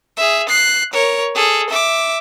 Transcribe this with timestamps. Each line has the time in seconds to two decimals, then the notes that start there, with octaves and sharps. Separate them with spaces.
0.17 G#4 E5
0.49 F#6 C7
0.93 A#4 C#5
1.35 G#4 A4
1.69 E5 D6